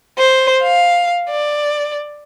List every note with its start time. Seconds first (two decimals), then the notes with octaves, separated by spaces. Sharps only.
0.18 C5
0.63 F5
1.31 D5